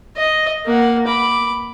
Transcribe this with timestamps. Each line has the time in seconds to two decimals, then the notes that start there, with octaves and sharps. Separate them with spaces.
0.16 D#5
0.65 A#3 F#5
1.06 B5 D6